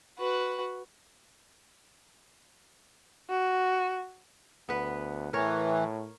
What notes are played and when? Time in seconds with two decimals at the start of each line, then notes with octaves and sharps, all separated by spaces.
0.19 F#4 B4
3.30 F#4
4.69 D2 B3 B4
5.33 A2 E3 A#4 C#5